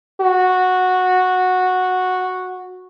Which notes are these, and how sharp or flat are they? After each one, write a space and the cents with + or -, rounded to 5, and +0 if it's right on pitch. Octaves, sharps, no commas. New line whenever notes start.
F#4 -10